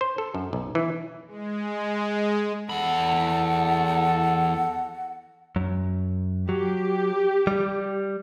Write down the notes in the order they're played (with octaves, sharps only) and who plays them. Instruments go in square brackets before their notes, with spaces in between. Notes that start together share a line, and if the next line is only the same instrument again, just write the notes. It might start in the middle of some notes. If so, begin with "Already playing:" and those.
[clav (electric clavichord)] C5
A4
F#2
B1
E3
[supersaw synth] G#3
[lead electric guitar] E2 B5 [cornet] A4 [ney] F#5
[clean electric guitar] F#2
[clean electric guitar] F#3 [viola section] G4
[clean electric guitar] G3